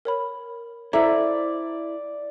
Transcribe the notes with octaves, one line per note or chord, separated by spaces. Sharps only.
A#4 C#5 B5
E4 A4 C5 D5 E5 A#5